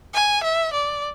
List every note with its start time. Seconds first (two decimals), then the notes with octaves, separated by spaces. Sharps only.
0.14 G#5
0.43 E5
0.73 D5